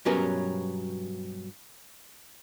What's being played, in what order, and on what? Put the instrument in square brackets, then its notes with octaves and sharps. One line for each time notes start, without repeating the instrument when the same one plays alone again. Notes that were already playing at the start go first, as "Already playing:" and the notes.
[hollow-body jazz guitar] G2 B2 F#3 C#4 A#4 B4